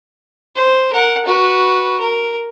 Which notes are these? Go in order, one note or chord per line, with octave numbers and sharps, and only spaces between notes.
C5
A#4 F#5
F#4 B4
A#4